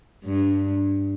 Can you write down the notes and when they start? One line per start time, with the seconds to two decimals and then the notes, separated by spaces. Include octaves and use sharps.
0.25 G2